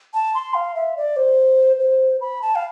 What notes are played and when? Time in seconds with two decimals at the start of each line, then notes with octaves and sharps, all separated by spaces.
0.14 A5
0.35 C6
0.54 F5
0.75 E5
0.97 D5
1.16 C5
1.79 C5
2.21 B5
2.42 A5
2.55 F5